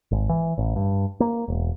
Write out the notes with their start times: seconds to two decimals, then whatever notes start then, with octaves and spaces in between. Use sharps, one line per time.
0.11 G#1
0.29 E3
0.58 A1
0.76 G2
1.20 A#3
1.48 E1